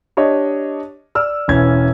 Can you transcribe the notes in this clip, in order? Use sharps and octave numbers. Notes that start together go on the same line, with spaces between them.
D4 G4 C#5 D#5
D5 E6 F6
E1 E3 C#4 G#6